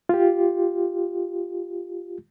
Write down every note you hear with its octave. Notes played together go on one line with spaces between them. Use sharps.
F4 G4